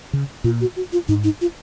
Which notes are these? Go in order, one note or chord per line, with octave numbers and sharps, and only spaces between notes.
C#3
A#2 F4
F#4
F#4
F4
G#2 D#4
D#4
F4